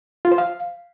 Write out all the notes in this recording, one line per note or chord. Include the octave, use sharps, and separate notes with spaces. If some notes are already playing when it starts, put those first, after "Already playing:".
F4
C5
F5